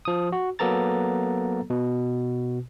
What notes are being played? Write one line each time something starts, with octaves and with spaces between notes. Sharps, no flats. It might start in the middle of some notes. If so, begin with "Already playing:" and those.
F3 D#6
F#4
F#3 A#3 B3 A4 A#5 A6
B2